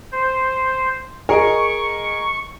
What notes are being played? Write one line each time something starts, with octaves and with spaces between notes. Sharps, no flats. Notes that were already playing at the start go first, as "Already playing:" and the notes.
C5
G#4 A#4 D#5 C#6